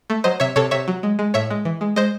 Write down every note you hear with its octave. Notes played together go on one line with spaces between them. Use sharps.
A3
F#3 C5 D#5
C3 C#5 E5
C3 A4 C#5
C3 C#5 E5
F#3
G#3
G#3
A2 C#5 E5
G#3
E3
G#3
G#3 C5 D#5